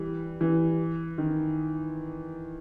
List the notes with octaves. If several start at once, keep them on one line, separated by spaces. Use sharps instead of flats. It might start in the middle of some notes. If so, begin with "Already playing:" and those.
Already playing: E3 G3
E3
D#3